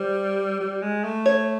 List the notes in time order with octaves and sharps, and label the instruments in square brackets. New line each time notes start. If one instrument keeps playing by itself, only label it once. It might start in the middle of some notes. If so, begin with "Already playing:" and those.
Already playing: [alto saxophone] G3 [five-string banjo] C5
[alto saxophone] G3
G#3
A3
[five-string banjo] C#5